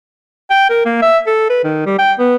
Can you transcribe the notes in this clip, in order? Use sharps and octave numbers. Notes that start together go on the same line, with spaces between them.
G5
A#4
A#3
E5
A4
B4
D#3
G3
G5
B3